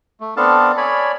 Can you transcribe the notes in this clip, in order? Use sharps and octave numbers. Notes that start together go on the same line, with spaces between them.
A3
B3 C4 D4 A4 F5 A5
C#5 D5 G#5 B5